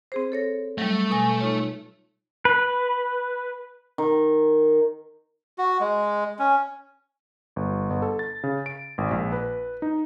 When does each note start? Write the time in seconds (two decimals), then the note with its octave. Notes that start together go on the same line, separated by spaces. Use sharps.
0.12 C4 G#4 C5
0.32 A4 C#5 A#6
0.78 F#3 G3 A3
1.11 B2 G#5 A#6
1.41 D#4 F4 C#5
2.45 B4
3.98 D#3
5.58 F#4
5.80 G#3
6.39 C#4
7.56 G1
7.90 G1
8.02 A4
8.19 A6
8.44 C#3
8.66 D7
8.98 G#1
9.11 A#1
9.32 B4
9.82 D#4